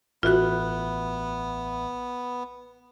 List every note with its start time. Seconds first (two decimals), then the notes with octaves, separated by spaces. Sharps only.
0.23 A1 B3 F4 F#4 E5 F#6